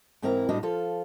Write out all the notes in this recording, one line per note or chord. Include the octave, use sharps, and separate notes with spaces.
G#2 E3 C4 E4 A#4 A#5
A2 G3 D4 F#4 D#5
F3 F4 A4 F5